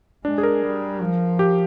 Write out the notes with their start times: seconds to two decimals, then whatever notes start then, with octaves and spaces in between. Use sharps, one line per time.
0.25 G#3 D4
0.38 G#4
0.43 A#4
0.62 G3
1.00 F3
1.39 G4